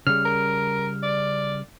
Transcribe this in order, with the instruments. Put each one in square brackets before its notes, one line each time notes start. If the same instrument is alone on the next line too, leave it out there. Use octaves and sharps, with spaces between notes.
[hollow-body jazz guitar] C#3 G3 [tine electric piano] F6
[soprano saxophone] A#4
D5